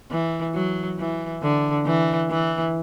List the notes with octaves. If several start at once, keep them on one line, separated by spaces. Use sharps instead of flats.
E3
F#3
E3
D3
E3
E3